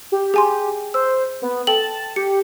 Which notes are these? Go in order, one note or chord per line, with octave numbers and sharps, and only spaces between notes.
G4
G#4 G#5 C6
C5 E6
B3
A4 G5 A5 F#7
G4 C#7